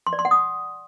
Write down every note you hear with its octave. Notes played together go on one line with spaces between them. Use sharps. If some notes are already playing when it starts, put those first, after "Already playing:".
C6
D5
C6
F#5
D#6